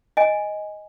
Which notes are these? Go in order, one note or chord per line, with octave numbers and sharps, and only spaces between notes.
D#5 G#5